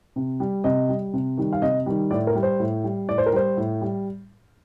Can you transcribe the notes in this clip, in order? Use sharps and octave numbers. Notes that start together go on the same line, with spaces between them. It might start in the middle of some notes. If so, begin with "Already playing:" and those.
C3
G3
C3 D#5
G3
C3
D#3 G3
F5
C3 D#5
D#3 G3
A2 D5
A#4
G3
C5
A2
G3
A2 D5
C5
A#4
G3 C5
A2
G3